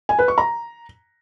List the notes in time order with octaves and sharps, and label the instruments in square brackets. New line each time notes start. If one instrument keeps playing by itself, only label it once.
[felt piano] G#5
B4
C#6
A#5